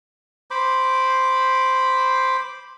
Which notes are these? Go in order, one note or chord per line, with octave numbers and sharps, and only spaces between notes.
C5 B5 D6